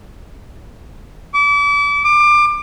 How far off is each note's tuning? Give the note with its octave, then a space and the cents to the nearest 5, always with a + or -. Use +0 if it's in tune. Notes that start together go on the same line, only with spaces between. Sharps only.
D6 -35
D6 +25